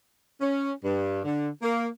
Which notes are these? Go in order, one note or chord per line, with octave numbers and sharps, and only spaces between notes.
C#4
G2
D3
A#3